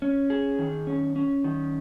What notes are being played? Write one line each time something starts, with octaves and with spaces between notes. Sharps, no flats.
C#4
G#4
D#3
C#4
C#4
D#3